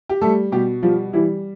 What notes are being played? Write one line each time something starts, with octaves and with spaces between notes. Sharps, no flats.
G4
G3 A3 A4
B2 G3 G4
F3 G3 F4
E3 G3 E4